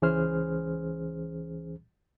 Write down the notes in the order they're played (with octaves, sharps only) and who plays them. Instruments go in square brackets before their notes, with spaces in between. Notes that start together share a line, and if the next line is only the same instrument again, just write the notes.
[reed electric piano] C#2 E3 C#4 G#4 C5 F6